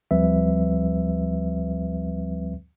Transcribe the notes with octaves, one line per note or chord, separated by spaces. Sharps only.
D2 F3 G3 C4 B4 E5